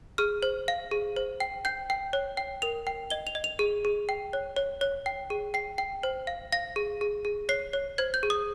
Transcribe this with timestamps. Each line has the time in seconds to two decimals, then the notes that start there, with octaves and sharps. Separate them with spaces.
0.18 G#4 F6
0.43 C5
0.68 F5
0.91 G#4
1.16 C5
1.40 G5
1.65 G5 G6
1.90 G5
2.13 C#5
2.37 G5
2.62 A#4 F7
2.87 G5
3.10 D#5 G7
3.27 F7
3.35 D#5
3.44 F7
3.59 G#4
3.85 G#4
4.09 G5
4.33 C#5
4.56 C#5
4.81 C#5
5.06 G5
5.30 G#4
5.54 G5 C7
5.78 G5
6.03 C5
6.27 F5
6.52 F5 A#6
6.76 G#4
7.01 G#4
7.25 G#4
7.49 C#5 C7
7.73 C#5
7.98 C5 G#6
8.14 G6
8.23 G#4
8.30 D#6